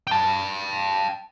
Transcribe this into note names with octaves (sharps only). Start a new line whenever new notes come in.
G5 A5